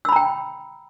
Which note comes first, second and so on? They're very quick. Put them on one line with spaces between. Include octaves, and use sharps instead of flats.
E6 B5 A#5 G5